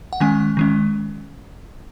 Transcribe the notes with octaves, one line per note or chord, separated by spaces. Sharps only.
F#5
D#3 G#3 C#4 G#5
D#3 G#3 C#4